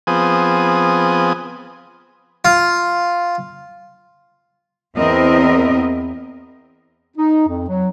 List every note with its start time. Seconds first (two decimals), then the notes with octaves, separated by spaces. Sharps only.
0.07 F3 B3 C4 G#4 D#6
2.45 F4
4.96 E2 C4 E4 A#4 D#5
7.17 D#4
7.48 F2
7.68 F#3